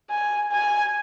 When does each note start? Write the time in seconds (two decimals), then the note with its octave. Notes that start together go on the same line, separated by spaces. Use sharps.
0.10 G#5
0.51 G#5